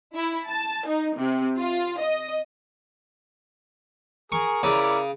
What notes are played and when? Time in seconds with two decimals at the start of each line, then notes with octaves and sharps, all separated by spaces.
0.14 E4
0.48 A5
0.87 D#4
1.18 C3
1.58 F4
1.99 D#5
4.32 G#4 A#4 C#6
4.63 C#3 E4 A#4 D5